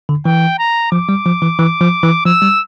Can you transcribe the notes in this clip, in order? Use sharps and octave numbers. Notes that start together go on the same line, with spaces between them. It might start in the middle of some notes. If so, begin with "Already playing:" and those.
D3
E3 G5
A#5
F3 D6
G3
F3
E3
E3
F3
E3
F3 E6
G3